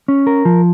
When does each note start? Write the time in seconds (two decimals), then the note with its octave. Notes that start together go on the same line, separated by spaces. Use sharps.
0.08 C#4
0.27 A#4
0.45 F3